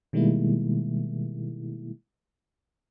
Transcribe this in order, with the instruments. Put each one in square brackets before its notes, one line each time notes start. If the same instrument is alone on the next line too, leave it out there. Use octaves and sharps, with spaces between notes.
[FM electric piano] B2 D#3 G3 G#3 A#3 E4